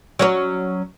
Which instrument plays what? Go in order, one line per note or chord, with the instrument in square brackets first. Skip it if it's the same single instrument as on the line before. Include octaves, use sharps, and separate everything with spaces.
[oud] F#3 C#4 C#5